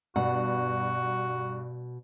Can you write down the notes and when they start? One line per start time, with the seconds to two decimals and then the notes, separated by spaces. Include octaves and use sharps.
0.16 G2 B2 F#4 F#5